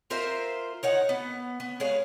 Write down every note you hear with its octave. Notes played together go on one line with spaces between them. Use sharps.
F4 A#4 C5 E5
D#4 C#5 F#5
B3
B3
G#3 G#4 C#5 F5